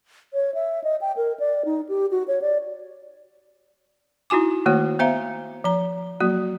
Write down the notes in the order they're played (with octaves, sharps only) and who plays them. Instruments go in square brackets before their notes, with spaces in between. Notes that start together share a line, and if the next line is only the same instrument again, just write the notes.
[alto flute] C#5
E5
D#5
G5
A#4
D5
D#4
G4
F#4
C#5
D5
[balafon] D#4 E4 F#4 G#5 D6
D#3 A3 A#3 F#4 C#5
B3 C5 E5 F5 A#5
F3 A#5
F#3 A#3 F#4